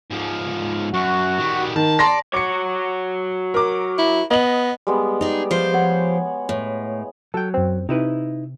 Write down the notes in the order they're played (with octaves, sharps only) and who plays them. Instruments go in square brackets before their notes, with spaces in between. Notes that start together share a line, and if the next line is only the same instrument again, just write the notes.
[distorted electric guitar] G#2 F3
[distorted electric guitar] F#2 [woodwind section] F#4
[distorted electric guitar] D#3 G3
[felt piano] D#3 [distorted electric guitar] A5
[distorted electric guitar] D5 [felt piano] A5 C6 A#6
[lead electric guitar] F#4 C#5 [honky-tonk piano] D6 C#7
[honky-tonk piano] A#4 D6
[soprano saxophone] E4
[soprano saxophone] B3 [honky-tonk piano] D#5 F#7
[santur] G3 G#3 B3
[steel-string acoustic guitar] D#4 G#4 [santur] D5
[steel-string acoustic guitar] F3 G4 C5
[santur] C#5 F#5
[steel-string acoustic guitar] A2
[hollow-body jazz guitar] F#3 [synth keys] A4 G5
[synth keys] F#2 C4
[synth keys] C3 [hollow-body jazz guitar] D#4 E4 B4